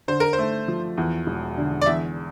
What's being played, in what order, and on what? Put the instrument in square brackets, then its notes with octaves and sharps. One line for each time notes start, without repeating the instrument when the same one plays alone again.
[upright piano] D3 [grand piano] C5
[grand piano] A#4
C5
[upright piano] A3
F3
E2
E1
D3
[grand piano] D5
[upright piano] E2 [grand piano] E5